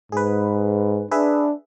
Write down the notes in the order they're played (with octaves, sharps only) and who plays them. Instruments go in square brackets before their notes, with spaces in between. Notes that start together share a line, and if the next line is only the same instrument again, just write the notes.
[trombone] G#2 [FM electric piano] G#4 B4
[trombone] D4 [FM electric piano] G#4 B4 E5